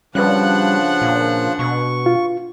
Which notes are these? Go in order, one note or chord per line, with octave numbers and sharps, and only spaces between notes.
C#3 F3 G3 C#4 D4 B4 F#5 F#6
A#2
B2 C#6
F4